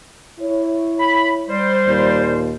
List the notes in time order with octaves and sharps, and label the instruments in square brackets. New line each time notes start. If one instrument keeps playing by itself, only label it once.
[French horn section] E4 C#5
[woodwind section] B5
G3 C5
[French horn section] D#2 A#2